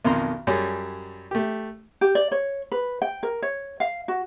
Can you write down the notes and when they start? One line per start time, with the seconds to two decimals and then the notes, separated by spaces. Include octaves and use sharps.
0.05 B1 F2 D#3 A#5 C6
0.47 F#2 G3 G#4 C#5 D5
1.31 A3 G4
2.01 G4
2.15 D5
2.32 C#5
2.72 B4
3.02 G5
3.23 A#4
3.42 C#5
3.80 F5
4.08 F#4